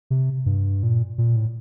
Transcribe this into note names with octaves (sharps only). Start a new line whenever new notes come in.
C3
G2
A#2
A#2
A2